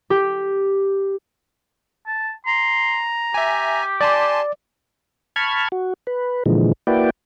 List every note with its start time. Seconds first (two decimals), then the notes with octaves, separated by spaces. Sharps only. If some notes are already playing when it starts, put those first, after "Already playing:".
0.10 G4
2.07 A5
2.47 A#5 C6
3.34 G4 E5 G#5
4.01 D5 G#5 A5 C6
5.36 A5 B5 C#6 F6 G#6
5.72 F#4
6.07 B4
6.46 A#2 D3 E3 F3 G#3
6.87 A#3 E4 F#4 B4 D5 G5